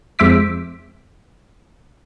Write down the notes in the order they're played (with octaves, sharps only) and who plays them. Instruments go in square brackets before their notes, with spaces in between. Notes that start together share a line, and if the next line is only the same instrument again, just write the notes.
[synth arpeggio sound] F2 G#3 C5 E5 D6 B6